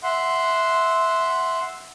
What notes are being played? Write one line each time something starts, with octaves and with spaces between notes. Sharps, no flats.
E5 F#5 C6